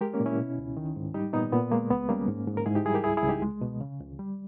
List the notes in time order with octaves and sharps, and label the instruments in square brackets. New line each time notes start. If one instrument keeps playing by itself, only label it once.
[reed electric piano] G#3 G4 A#4
A#3 C#4
A#2
C#4 E4
B2
C#2
D#3
G#2
G3 D#4 G4
A#2 B3 D#4
A#2 B3
G#3 A#3
C#2 B3
G3 A#3 C#4
G#2
G#2
A#4
G#2 E4 G#4
D#4 G4
G3 E4 G#4
G4 A#4
C#2 E4 G#4
E4 G#4
C#2
D#4 G4
G#3
B2
C#3
C#2
G3